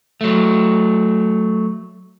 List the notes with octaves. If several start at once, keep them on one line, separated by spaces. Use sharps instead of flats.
F#3 A3